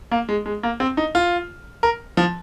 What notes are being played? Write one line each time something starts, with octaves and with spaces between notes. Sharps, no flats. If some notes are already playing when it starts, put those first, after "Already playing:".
A#3
G#3
G#3
A#3
C4
D#4
F4
A#4
F3